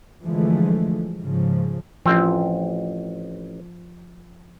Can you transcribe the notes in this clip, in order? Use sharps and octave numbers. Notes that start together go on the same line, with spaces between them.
D3 E3 F3 G#3 A3
G#2 C#3 F3
A1 F3 C4